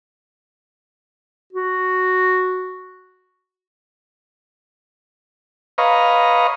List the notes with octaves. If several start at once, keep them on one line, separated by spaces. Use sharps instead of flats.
F#4
B4 C#5 D#5 F5 A#5